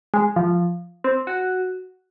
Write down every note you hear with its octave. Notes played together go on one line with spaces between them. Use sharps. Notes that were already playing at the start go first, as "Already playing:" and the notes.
G#3
F3
C4
F#4